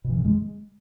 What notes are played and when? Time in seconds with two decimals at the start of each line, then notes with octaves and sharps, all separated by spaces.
0.04 B2
0.10 E3
0.15 F#2
0.20 C#3
0.25 G#3